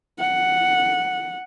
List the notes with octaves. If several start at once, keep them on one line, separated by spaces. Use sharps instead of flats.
F#5